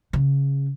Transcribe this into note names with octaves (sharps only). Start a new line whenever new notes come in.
C#3